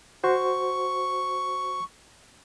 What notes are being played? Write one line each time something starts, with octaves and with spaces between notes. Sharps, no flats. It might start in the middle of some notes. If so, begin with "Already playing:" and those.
F#4 C5 C#6